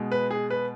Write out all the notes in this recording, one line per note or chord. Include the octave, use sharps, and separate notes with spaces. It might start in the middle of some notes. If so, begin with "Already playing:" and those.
Already playing: B2 G#3
B4
G#4
B4